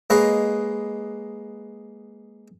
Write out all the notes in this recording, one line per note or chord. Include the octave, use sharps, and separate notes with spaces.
G#3 A#3 B4 C#5 D#5